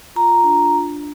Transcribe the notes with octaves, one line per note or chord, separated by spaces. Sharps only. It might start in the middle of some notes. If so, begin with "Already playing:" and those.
F4 A#5
D4